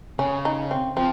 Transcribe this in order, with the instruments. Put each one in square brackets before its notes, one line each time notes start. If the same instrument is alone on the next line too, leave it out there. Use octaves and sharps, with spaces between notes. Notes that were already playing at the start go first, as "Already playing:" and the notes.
[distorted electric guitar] C#3 [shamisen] C#4
[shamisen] D#4
C4
[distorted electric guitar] F3 [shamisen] C4